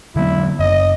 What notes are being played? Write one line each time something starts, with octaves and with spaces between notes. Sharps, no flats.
D3 F#3 B3 E4
F#1 D#5